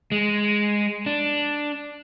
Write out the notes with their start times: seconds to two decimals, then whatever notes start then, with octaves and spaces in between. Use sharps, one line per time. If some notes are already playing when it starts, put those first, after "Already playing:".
0.12 G#3
1.06 D4